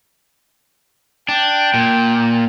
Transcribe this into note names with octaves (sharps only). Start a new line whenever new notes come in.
D4 G5
A#2